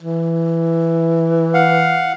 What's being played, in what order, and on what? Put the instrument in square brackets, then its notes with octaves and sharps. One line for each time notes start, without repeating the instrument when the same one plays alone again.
[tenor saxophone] E3
[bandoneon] F5 F#5